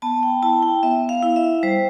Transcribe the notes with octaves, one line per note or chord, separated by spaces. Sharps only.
B3 A5
G5
E4 A5
G5
B3 E5
F5
E4
E5
G3 C5